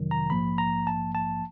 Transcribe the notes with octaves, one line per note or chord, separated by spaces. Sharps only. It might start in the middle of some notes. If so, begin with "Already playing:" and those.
Already playing: G1 F2 C3 D#3 F#3
A#5
A#1 G#2 F3 A#3 B5
A#5
A5
A5